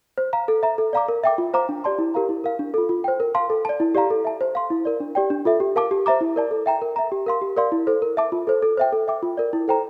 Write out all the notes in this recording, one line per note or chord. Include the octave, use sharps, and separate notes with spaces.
C5
F5 A#5
A4
E5 A#5
A4
D5 F5 A#5 D6
A#4
E5 G5 D6
F4
C5 F5 A#5 D6
D4
G4 D5 A5 C6
E4
G4 A#4 F5 A#5
E4
A#4 F5
D4
F4 A4
F4
C5 G5
A#4
F5 A5 C6
A4
D5 A5
E4
G4 D5 F5 A#5
A4
E5 A5
C5
F5 C6
E4
A#4 D5
D4
G4 D5 G5
D4
F4 A4 E5
G4
A#4 F5 A5 D6
G4
C5 E5 A#5 D6
E4
A#4 D5 A5
A4
E5 G5 A#5
A#4
E5 A#5
G4
A#4 F5 C6
G4
A#4 D5 F5 C6
E4
A4 C5
A#4
E5 A5 D6
F4
A4 C5
A4
C5 E5 G5
A4
E5 G5 D6
F4
A#4 D5
E4
A4 C5 G5 A#5